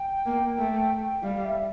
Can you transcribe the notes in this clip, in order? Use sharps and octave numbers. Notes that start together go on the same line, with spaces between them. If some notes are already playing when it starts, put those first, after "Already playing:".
Already playing: G5
A#3
A3
G3 F5
E5